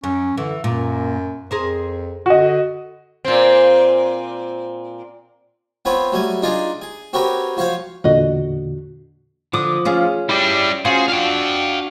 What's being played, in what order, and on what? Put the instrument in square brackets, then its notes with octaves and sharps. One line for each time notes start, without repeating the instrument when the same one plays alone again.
[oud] F#2 [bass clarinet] C#4
[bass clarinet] D3 [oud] E3
[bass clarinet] F#2 [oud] A#2
[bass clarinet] F2 [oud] G#4 A#4 C5
[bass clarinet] D3 [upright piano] F#4 D#5
[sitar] A#2 C4
[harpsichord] B3 C4 F4 C#5 B5
F#3 G3 A3 G#5
D4 D#4 F4 G#4 D5 A#5
G#4
C4 F#4 G4 A#4 B4 C#5
F3 F#4 C5 C#5 F5
[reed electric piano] E2 A#2 D3 [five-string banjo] F#4 D#5
[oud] D3 [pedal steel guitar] F3 D6 D#6
[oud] C#4 F4 G#4
[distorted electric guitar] G3 D4 [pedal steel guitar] E4 G4
[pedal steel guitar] C#4 F#4 C5 [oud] F4 [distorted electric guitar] G#4
[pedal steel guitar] D4 F#4 [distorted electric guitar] F5 G5